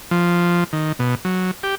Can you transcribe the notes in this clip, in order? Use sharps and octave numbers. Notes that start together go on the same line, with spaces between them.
F3
D#3
B2
F#3
G4